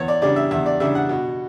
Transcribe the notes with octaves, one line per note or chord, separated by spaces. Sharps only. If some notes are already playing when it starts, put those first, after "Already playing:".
Already playing: E2 C#5
D5
C#3 G3 D4 D5
E5
E2 E5
D5
C#3 G3 D4 E5
F#5
B2